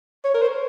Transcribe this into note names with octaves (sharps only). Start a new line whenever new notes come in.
C#5
A#4
C5